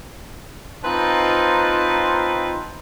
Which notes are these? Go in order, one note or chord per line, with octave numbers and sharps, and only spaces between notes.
C4 D#4 F4 B4 C5 A5